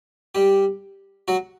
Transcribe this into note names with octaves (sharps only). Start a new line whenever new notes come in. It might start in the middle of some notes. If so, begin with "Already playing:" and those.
G3 G4
F#3 F#4